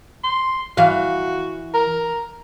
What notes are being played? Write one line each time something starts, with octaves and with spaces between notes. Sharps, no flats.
C6
E3 F#4 F5
A#4